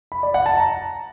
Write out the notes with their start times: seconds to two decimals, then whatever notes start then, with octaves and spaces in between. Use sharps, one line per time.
0.12 B5
0.23 D5
0.34 F#5
0.46 A5
0.57 A#5